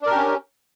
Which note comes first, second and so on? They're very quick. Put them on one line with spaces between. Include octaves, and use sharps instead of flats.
D4 A#4 G4 C#4